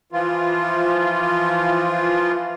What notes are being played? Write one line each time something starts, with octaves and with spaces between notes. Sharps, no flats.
E3 F3 F4